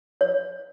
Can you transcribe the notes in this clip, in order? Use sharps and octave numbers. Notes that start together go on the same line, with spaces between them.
C#5